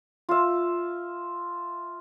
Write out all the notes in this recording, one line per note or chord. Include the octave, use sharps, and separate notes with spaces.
F4 E5